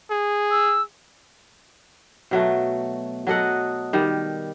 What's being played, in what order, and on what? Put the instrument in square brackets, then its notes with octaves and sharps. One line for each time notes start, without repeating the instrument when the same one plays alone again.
[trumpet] G#4
[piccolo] E6
[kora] B2 F#3 A3
F#3 A4 D#5 F#5
D#3 G3